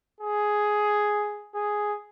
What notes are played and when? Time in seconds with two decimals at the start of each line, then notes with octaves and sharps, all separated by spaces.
0.21 G#4
1.55 G#4